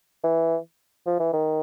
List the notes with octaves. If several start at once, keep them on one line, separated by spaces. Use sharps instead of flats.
E3
F3
E3
D#3